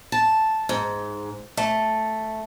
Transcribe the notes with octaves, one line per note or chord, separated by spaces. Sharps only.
A5
G#2
A3